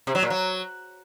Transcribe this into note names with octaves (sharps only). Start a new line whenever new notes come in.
C3
F#3
A#2
F#3